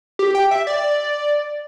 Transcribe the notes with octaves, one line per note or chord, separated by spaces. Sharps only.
G4
G5
E5
D5